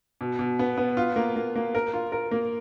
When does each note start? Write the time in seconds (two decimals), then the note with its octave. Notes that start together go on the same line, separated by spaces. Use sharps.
0.21 B2
0.39 B2
0.59 B3
0.77 B3
0.97 F4
1.16 A#3
1.36 A#3
1.56 A#3
1.75 A#4
1.93 F4
2.12 A#4
2.31 A#3